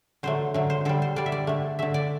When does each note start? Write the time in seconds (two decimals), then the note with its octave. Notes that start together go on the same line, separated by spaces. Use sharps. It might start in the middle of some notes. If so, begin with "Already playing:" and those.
0.23 D3 F#3 A3 C5
0.54 D3 F#3 A3
0.70 C5
0.85 D3 G3 A4
1.02 C5
1.16 D3 G3 D5
1.26 E5
1.32 D5
1.47 D3 A3
1.79 D3 A3 E5
1.94 D5